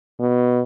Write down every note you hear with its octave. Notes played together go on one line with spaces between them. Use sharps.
B2